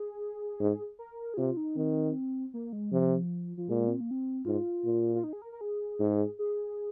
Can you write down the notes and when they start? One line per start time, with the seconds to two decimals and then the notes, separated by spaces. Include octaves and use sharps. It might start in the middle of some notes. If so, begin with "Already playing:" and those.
Already playing: G#4
0.60 G#2
0.99 A#4
1.34 G#4
1.37 C3 F4
1.57 D#4
1.76 D#3 C4
2.54 A#3
2.73 G#3
2.92 C3 F3
3.57 F3
3.69 A#2 G#3
3.88 C4
4.00 A#3
4.11 C4
4.45 G#2 F4
4.85 A#2
5.15 F4
5.24 D#4
5.33 G#4
5.42 A#4
5.52 A#4
5.61 G#4
6.00 G#2
6.39 G#4